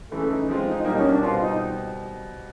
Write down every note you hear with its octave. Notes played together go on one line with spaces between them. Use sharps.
C#3 E3 A3 A4
D#4
F3 G#3 C4 F4
D#4
B2 G3 A#3 D#4
C#4
D4
B2 G3 C4 F4
D#4